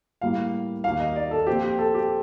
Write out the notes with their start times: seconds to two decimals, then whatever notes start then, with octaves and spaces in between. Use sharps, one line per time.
0.21 A2 G3 A#3 F5
0.84 D#2 D#3 A#3 F5
1.00 D#5
1.16 D5
1.31 A4
1.47 A#2 F3 C4 G4
1.63 G4
1.79 A4
1.94 G4